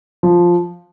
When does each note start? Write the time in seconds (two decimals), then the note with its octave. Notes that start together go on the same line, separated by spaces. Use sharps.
0.23 F3